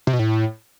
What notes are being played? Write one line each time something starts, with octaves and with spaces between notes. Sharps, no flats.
C3
B2
A2